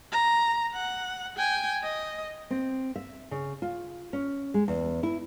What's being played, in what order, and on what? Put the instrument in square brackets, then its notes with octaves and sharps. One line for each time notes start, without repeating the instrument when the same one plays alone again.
[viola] A#5
F#5
G5 G#5
D#5
[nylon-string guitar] C4
E5
C#3
F4
C#4
G#3
E2
E4